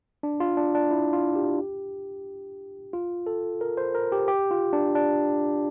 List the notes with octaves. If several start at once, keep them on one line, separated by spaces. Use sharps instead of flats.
D4
F4
D4
D4
E4
F4
G4
F4
A4
A#4
C5
A#4
G4
G4
F4
D4
D4